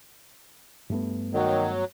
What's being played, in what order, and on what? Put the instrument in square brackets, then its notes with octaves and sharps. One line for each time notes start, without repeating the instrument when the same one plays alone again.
[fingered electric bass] G2 A3 B3
[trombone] D#3 [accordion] F#3